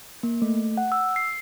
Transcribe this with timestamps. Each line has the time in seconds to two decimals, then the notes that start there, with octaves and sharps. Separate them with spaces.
0.23 A#3
0.42 A3
0.77 F#5
0.92 E6
1.16 C7